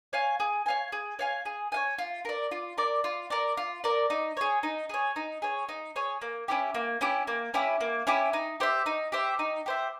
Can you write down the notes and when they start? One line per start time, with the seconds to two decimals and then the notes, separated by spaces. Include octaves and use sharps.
0.13 C#5 F5 G#5
0.40 G#4
0.66 C#5 F5 G#5
0.92 G#4
1.19 C#5 F5 G#5
1.45 G#4
1.72 C#5 F5 G#5
1.98 F4
2.25 A#4 D5
2.51 F4
2.78 A#4 D5
3.04 F4
3.30 A#4 D5
3.57 F4
3.84 A#4 D5
4.10 D#4
4.37 G#4 C#5
4.63 D#4
4.89 G#4 C#5
5.16 D#4
5.42 G#4 C#5
5.69 D#4
5.96 G#4 C#5
6.22 A#3
6.48 C#4 E4 G4
6.74 A#3
7.01 C#4 E4 G4
7.27 A#3
7.54 C#4 E4 G4
7.80 A#3
8.07 C#4 E4 G4
8.33 D#4
8.60 G4 C5 E5
8.86 D#4
9.12 G4 C5 E5
9.39 D#4
9.66 G4 C5 E5